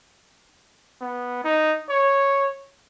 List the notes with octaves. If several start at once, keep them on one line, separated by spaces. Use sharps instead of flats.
B3
D#4
C#5